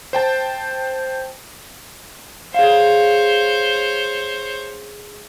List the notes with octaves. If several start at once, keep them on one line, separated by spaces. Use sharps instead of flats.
C5 G5 A5
G#4 C5 C#5 F5